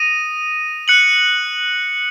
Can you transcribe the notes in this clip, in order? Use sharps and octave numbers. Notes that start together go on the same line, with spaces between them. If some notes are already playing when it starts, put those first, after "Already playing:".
Already playing: D#6 A#6 D#7
F#6 C#7 F#7